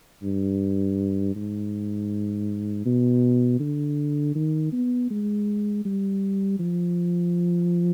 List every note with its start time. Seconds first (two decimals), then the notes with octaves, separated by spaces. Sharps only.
0.23 G2
1.35 G#2
2.85 B2
3.59 D3
4.35 D#3
4.72 B3
5.10 G#3
5.85 G3
6.59 F3